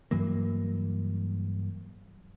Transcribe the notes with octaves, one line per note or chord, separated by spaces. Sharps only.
G2 E3 F#3 A#3